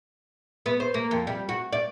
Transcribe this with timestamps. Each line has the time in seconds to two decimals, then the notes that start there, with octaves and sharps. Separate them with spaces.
0.66 B3
0.80 C5
0.94 A#3
1.11 F2
1.27 G3
1.49 F#4
1.73 D5